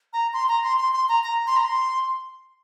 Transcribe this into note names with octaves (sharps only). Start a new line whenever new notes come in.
A#5
C6
A#5
C6
C6
C6
A#5
A#5
C6
A#5
C6